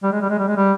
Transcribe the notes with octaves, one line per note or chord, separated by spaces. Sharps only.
G3
G#3
G3
G#3
G3
G#3
G3